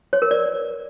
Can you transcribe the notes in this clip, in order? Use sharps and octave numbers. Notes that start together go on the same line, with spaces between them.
C#5
A#4
D5